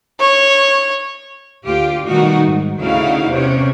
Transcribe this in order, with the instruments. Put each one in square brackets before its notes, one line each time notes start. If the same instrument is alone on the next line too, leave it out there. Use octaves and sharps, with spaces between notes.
[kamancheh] C#5
[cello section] D2 F4 G4
B2 D#3 G3 A3 D#4 F#4
G#2
D2 C#3 D#4 E4 F#4 F5
E2 C3 C#4 C#5